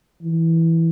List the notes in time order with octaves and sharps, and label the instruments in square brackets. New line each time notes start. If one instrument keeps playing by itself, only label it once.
[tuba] E3